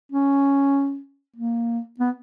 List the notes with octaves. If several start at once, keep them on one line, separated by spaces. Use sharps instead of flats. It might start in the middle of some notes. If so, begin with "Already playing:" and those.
C#4
A#3
B3